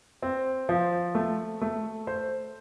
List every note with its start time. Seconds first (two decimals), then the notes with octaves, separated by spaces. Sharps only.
0.22 C4
0.69 F3
1.15 A3
1.62 A3
2.07 C5